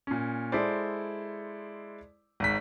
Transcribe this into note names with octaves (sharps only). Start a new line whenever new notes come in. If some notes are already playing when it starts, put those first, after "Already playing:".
A#2 C#4
G#3 E4 A4 C5 D5
G#1 G#2 B6